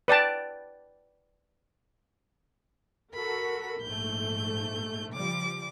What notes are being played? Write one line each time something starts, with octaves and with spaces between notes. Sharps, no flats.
B4 D5 G5 A5
F#4 A4 A#4 B5
A#1 G#2 A3 G6
C#3 F3 G3 D6